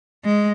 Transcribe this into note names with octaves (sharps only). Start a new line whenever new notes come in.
G#3